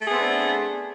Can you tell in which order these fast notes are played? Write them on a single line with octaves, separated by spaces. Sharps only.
A3 G#4 B3 C4 D4